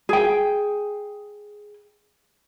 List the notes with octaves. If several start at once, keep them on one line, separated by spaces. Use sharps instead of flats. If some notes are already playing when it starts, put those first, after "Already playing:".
G#4 G5